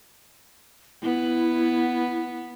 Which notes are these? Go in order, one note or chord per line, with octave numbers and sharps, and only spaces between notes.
B3 E4